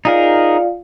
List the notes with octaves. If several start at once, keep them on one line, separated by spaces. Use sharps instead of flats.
D#4 F4 G#4 A#4 D5 F5